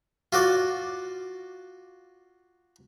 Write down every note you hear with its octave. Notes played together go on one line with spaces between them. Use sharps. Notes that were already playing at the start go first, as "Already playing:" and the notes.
F4 F#4 D5